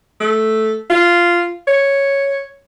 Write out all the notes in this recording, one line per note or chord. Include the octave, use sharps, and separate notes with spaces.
A3
F4
C#5